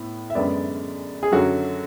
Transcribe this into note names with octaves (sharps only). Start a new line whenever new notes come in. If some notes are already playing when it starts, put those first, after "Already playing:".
Already playing: A2 B3
E5
F#2 D3 G#3 B3 D5
G#4
F#2 D3 F#3 F#4